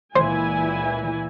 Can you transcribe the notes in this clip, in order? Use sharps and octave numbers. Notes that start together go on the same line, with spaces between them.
C#2 A#2 E3 E4 C5 G#5